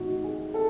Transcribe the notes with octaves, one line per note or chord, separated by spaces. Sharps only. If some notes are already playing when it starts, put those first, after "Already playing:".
Already playing: A2 E3 D#4 F#4
G#4
A4